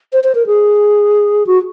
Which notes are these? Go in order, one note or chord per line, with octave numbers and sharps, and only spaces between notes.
C5
C5
A#4
G#4
F#4